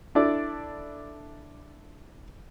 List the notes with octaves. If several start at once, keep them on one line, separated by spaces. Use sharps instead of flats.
D4 E4 A4 D5